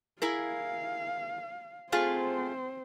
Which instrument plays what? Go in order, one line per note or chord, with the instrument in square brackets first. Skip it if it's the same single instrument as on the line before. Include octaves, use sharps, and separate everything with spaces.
[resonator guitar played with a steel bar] E4 G#4 A#4 [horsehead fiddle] F5
[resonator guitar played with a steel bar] A3 F4 G#4 [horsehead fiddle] C4 C5